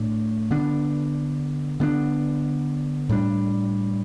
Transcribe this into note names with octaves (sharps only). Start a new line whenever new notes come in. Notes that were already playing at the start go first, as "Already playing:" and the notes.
Already playing: A2 A3 D4
D3 B3 D4
D3 B3 D4
A2 G3 D4